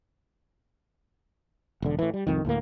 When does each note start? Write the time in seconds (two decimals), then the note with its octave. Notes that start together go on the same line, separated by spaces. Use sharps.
1.82 E1 D3
1.99 A2 E3
2.14 G3
2.27 C2 F2 D#3
2.45 D2 A2 A#3